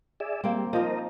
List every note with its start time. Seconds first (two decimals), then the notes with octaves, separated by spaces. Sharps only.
0.20 G#4 D5 E5
0.44 G3 A#3 C4
0.73 F3 D#4 A#4 C5 D#5